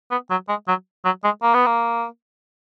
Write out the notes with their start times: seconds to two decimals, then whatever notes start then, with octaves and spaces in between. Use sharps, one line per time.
0.11 B3
0.30 F#3
0.49 G#3
0.68 F#3
1.05 F#3
1.24 G#3
1.42 A#3
1.54 B3
1.66 A#3